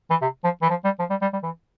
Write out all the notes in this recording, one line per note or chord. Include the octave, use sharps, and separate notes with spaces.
E3
C3
F3
E3
F3
G3
F3
G3
G3
G3
E3